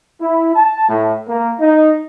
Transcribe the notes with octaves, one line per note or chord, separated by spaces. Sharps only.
E4
A5
A2
A#3
D#4